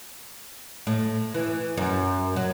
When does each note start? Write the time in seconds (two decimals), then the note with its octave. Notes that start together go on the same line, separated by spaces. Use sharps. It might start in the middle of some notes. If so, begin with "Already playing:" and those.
0.87 A2
1.34 E3
1.77 F#2
2.36 F#3